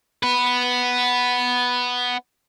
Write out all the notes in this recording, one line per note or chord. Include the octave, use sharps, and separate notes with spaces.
B3 B4